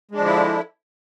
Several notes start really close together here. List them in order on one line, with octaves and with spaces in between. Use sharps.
G#3 D4 F3 D3 E4